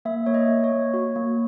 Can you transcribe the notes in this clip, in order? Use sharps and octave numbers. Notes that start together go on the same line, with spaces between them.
A#3 E5
A#3 C#5
D#5
A#3
C#5
A#3
F#4
A#3